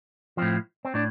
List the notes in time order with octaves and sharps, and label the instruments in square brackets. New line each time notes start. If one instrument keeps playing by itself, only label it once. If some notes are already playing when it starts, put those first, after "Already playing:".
[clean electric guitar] A2 F3 C4
C4
A2 D4